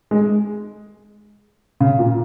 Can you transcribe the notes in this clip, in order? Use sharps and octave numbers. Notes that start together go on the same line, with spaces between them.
G#3
C#3
A#2